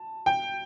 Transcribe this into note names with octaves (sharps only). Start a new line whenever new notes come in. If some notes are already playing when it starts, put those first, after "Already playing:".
Already playing: A5
G5